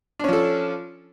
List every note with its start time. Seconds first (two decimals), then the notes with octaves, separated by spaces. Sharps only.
0.19 D4
0.24 C#4
0.28 F3
0.33 A4